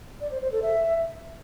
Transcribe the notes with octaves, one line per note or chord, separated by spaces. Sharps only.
D5
C5
C5
A4
E5